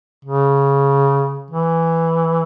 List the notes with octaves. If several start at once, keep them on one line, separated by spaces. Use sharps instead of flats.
C#3
E3